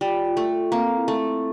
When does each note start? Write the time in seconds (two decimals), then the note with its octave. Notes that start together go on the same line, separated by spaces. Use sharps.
0.01 G3 F4
0.25 F4
0.37 A3
0.49 A4
0.72 A#3 C4
0.96 E4
1.08 A3
1.20 A4